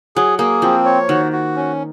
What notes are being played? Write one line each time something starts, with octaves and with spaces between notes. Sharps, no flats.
F#3 G#4
A#3 G#4
F3 C4
C#5
D#3 F#4
F#4
C#4